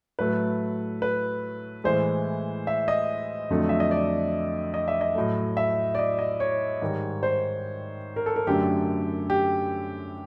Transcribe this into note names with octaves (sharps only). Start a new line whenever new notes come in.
A2 F#3 A3 B4
B4
A2 E3 G#3 C5
E5
D#5
F2 D3 F#3 A3
E5
D#5
D5
D#5
E5
D#5
A2 F#3 A3
E5
D5
D#5
D#5
C#5
G#2 D#3 G3
C5
A#4
A4
A#4
F#2 D3 F#3 A3 G4
G4